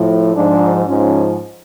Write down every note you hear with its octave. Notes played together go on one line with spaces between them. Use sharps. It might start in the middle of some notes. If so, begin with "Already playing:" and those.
Already playing: A2 F3
G#2 F3 D4
G#2 F3 C#4